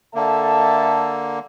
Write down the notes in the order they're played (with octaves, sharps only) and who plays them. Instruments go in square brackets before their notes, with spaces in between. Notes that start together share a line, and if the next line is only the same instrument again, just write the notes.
[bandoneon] D3 A#3 [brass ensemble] A4 E5 A5